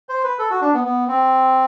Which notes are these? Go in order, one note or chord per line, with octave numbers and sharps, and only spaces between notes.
C5
B4
A4
F#4
D4
B3
B3
C4